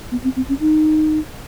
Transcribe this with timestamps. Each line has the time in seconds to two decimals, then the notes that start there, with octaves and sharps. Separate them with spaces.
0.12 B3
0.24 C4
0.36 C4
0.49 C#4
0.60 D#4